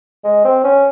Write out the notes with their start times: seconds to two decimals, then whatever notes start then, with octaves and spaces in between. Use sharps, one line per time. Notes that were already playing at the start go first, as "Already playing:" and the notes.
0.24 G#3
0.44 C4
0.64 C#4